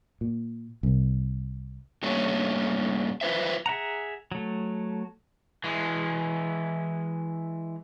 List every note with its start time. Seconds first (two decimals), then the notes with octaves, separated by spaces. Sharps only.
0.21 A#2
0.83 C2
2.03 G2 A#2 A3 C#4
3.21 F4 B4 C5 E5
3.66 G#4 E5 F#5 A#5
4.32 F#3 A3
5.64 E3 G#3